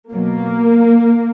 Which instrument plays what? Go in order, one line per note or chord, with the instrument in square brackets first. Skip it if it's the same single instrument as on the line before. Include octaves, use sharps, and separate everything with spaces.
[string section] B2 F#3 A#3